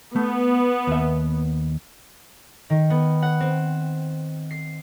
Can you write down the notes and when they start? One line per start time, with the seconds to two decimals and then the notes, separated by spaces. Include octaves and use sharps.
0.16 A3 B3
0.87 D#2 E5
2.70 D#3
2.90 B3
3.22 F#5
3.40 C4
4.51 C7